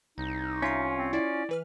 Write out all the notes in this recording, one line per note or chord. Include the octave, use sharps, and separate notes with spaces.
C2 D#4
C#4 F4 E5 D#6
C4
E4 D5
E3 B4 F6